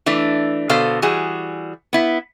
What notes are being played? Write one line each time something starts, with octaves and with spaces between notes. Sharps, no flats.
E3 A3 D4
B2 D3 A4 C5 F5
E3 G3 F#4 G#4
B3 E4